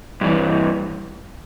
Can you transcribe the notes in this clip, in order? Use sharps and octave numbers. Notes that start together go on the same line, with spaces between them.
G2 E3